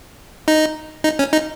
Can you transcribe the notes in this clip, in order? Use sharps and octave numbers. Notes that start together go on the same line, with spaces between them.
D#4
D#4
C#4
D#4